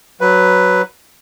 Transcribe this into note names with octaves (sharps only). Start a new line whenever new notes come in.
F#3 B4